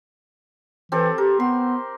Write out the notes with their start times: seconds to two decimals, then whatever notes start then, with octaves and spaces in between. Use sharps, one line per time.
0.92 E3 C4 G4 A4
1.18 G4 A#4
1.40 B3 C6